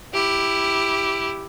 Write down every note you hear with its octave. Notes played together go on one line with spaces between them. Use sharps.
E4 G4